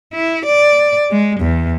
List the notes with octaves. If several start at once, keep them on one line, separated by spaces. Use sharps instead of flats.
E4
D5
G#3
E2